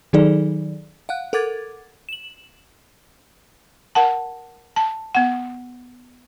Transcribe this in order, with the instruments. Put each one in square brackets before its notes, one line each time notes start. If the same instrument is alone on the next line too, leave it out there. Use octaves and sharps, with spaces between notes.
[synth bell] D#3 F#3 D#4 G#4 A4 D5
F5 F#5 F#6
A4 A#4 F#5 D6 G#6 A6
E7 F#7
[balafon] A#4 F#5 A5
A5
B3 F#5